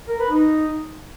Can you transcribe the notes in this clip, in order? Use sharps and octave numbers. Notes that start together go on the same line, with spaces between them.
A#4
B4
D#4